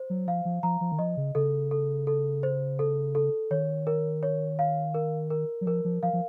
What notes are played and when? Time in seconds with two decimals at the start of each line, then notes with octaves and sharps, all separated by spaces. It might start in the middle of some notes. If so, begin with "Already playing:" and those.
Already playing: C5
0.10 F#3
0.27 F3 F5
0.45 F3
0.63 F3 A#5
0.81 F3
0.92 D#3
0.99 F3 D#5
1.17 C#3
1.35 C#3 A4
1.71 A4
2.07 A4
2.43 C5
2.79 A4
3.15 A4
3.51 D#3 C#5
3.87 A#4
4.23 C#5
4.59 F5
4.94 A#4
5.30 A#4
5.61 F#3
5.66 F3 A#4
5.85 F3
6.03 F3 F5
6.13 F3